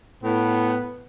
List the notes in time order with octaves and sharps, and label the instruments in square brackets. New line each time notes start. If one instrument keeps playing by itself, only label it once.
[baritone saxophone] A2 [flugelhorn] B3